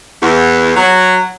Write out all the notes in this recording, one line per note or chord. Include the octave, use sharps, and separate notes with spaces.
E2
F#3